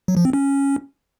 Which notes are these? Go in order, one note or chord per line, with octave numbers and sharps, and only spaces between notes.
F#3
F3
C4
C#4